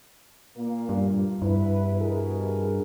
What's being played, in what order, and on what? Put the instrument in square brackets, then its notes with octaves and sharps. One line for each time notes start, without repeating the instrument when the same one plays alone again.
[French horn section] A#2 A#3
[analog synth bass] G2
[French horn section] E2 E4 B4 [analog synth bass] G2
[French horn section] B2 G#4 A#4